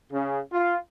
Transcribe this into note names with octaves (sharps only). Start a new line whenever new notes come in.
C#3
F4